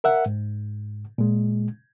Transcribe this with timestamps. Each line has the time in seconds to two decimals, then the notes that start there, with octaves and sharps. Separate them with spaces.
0.04 A#4 E5 F#5
0.26 G#2
1.18 A#2 G#3